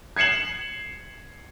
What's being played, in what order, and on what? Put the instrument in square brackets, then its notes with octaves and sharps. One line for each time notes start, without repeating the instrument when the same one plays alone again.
[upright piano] G#6 C7 C#7 E7 F#7